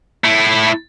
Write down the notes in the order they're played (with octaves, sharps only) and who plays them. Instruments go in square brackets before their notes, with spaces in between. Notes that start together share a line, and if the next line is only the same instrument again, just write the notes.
[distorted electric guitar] A3 E4